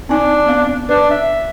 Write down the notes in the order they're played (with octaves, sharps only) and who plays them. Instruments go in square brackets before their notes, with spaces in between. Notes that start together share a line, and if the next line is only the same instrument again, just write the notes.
[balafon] C4 D#4 G#5 [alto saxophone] D4
[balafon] B3 C4 F5
[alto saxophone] D4 [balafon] B4
[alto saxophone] E5